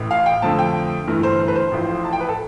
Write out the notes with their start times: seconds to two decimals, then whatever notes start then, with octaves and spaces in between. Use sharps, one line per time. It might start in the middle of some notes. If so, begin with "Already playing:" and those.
Already playing: A1 A2 E3
0.11 F5
0.26 G5
0.42 F2 D3 F3 A3 A5
0.59 G5
1.07 G1 G2 E3 A3
1.23 C5
1.40 C5
1.48 B4
1.56 C5
1.72 A1 A2 F3
2.05 A5
2.13 G5
2.20 B4
2.29 A4